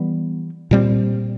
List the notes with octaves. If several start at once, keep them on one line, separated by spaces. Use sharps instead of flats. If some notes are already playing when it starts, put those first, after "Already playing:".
Already playing: E3 G3 B3
A#2 G3 C4